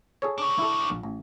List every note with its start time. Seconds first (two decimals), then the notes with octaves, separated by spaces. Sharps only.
0.22 G#4 A4 C#5
0.38 D4 F#4
0.58 E4 A4
0.90 A#1
1.03 A1